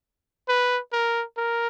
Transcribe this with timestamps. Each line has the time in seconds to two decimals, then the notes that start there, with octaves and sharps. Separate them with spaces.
0.49 B4
0.93 A#4
1.37 A#4